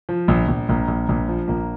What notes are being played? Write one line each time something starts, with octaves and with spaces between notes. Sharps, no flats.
F3
A#1
A#1
A#1 A#3
A#1
A#1
F3
A#1 A#3